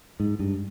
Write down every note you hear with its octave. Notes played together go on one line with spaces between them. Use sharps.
G#2
G2